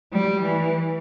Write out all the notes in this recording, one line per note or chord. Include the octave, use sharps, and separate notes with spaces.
G3
E3